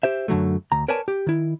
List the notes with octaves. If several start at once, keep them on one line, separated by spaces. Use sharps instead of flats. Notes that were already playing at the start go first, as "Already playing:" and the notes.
G4 C5 E5
F#2 D3 F#3 A3
D2 A#5
A#4 B4 C#5 D5 G#5 A5
G4
D#3 E4